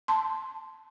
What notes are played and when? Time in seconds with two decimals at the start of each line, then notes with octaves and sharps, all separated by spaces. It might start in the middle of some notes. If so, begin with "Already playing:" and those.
0.08 A5 C6